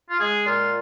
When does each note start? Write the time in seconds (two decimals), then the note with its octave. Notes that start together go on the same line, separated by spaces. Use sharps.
0.10 F4
0.20 G#3 G#4
0.45 A#2 F4